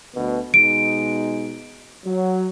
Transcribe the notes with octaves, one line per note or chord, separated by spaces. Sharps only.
D2 B2
B2 G#3 D#4 D7
F#3